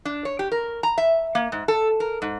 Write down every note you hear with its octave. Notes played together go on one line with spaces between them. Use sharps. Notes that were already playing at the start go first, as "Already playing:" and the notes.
D4
C#5
G4
A#4
A#5
E5
A#3
G#2
A4
A#4
G#2